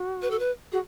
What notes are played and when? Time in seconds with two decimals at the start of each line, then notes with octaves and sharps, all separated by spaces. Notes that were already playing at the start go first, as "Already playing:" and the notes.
Already playing: F#4
0.22 B4
0.31 A4
0.39 B4
0.72 F#4 G#4